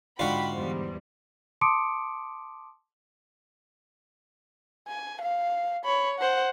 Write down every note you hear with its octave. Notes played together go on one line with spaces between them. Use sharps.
G#2 D3 F4 F#4 D5 G5 B5
E2 G3 C5
A5 C6 D6 D#6 C#7 D7
G#5
F5
C#5 B5
C5 F#5